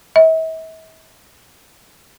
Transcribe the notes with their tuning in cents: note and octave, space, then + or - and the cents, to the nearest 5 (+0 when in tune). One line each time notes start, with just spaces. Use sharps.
E5 -45